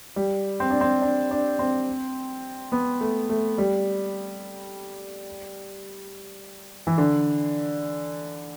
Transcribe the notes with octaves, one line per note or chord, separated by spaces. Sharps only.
G3
C4
D4
C4
D4
D4
C4
B3
A3
A3
G3
E3
D3